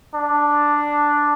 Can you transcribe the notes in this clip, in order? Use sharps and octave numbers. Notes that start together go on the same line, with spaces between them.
D4